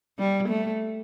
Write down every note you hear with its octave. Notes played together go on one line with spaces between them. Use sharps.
G3
A3